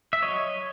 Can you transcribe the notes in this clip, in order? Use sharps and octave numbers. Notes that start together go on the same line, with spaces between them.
E5
F#3 C#5 D#5